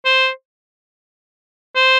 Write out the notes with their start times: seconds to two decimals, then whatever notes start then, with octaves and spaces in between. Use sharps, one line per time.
0.05 C5
1.76 C5